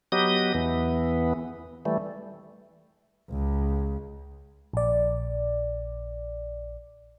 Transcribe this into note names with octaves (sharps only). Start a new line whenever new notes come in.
F#3 B3 G4 D#5 D#6
E2 E3 B3
E3 G3 A3
C#2
A#1 D5